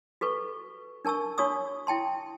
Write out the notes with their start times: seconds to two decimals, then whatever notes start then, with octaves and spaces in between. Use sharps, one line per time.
0.21 F#4 A4 B4 C#6
1.05 D4 A#4 A5 C#6 E6
1.38 D4 F#4 C#5 C#6 D#6 E6
1.87 E4 G5 A5 C6